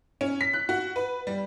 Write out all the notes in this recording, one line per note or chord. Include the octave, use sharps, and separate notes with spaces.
C#4
B6
F#6
F#4
B4
G3